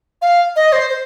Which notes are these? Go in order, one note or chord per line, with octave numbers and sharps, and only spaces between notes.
F5
D#5
C5
C5